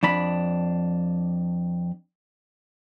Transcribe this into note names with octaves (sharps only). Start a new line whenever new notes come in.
F2 D4 B5